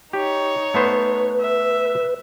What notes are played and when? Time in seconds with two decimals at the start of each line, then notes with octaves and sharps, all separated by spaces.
0.13 D#4 G4 C#5
0.74 A3 B3 B4 C5
1.41 E5